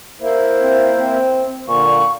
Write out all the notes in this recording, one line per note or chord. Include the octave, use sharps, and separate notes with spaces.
A#3 E4 C5
C4
C4
A#2 D3 F5 C#6